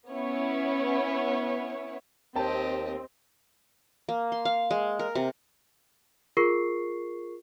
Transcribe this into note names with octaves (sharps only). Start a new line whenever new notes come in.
B3 C#4 E4 C#5
D#2 C4 G4 D#5 G5 A5
A#3
C6
F5
G#3
A#4
C3
F4 G#4 A#4 C#6 C7